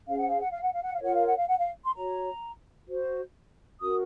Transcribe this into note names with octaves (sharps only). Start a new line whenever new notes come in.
C#4 G#4 C5 F5
F#5
F5
F#5
F5
F#5
F5
F#5
F5
F4 A#4 C#5 F#5
F5
F#5
F5
F#5
F5
C6
F#4 C#5 A#5
F#4 C5
C#4 F#4 A#4 D#6